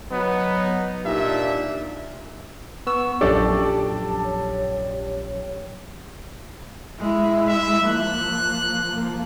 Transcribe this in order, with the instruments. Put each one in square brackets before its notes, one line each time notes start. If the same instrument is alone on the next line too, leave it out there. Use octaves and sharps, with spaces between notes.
[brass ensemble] F#3 [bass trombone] B3 [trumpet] D#4
[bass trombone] A#2 [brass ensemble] D4 D#4 G4 [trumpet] E5
[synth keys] B3 E6 [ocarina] C#6
[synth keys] A#1 F#2 G4 [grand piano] D4 A4 D5 [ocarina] A5
[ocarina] A5
C#5
[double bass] G#3 E4
[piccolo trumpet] E5
[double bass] F3 A#3 [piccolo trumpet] F#6
[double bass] F3 A#3